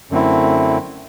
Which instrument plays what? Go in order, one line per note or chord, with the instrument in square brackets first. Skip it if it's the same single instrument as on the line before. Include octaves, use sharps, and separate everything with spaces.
[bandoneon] F#2 D3 A3 C4 E4